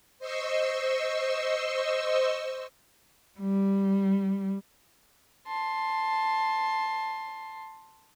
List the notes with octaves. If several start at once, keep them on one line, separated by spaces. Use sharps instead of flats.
C5 D#5 C6 C#6 E6
G3
A5 C6